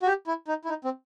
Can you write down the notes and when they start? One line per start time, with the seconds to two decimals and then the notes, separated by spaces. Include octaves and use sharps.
0.02 F#4
0.07 G4
0.27 E4
0.48 D#4
0.65 E4
0.69 D#4
0.84 C4